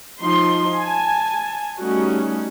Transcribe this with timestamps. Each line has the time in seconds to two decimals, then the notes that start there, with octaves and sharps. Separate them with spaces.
0.21 F3 D#4 C6
0.79 G#5 A5
1.79 G3 A3 C#4 D#4 F#4